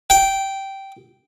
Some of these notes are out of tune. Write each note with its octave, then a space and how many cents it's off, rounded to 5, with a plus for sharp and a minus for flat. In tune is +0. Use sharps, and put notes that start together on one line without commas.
G5 -10